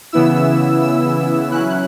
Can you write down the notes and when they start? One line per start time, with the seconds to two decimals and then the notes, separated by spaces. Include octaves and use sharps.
0.12 C#3 E3 B3 E4 E6
0.82 E6
1.51 F#3 C#4 E4 F#6